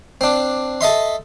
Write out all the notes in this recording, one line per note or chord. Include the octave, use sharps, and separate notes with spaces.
C4 D4
A4 D#5 E5 C6